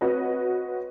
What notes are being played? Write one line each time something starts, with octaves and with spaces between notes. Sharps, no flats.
C4 F#4 B4 C#5 D#5